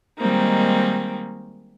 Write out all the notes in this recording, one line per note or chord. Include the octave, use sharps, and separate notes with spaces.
D#3 G3 G#3 A#3 C4 D#4